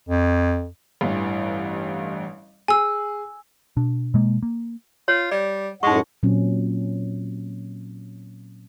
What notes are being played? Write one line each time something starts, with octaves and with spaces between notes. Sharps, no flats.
F2
A1 G2 E3
G#4 G#5 E6
B2 D4
B2 G#3 A#3
A#3
F4 C#5
G3 D5
F#2 A2 G#3 D#4 F#5 C#6
A#2 F#3 C4 C#4